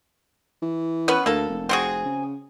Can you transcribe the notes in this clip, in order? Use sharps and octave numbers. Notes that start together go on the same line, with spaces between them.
E3
B3 C#4 B4
D2 A#3 A4
F1
C4 F#4 G#4
C#3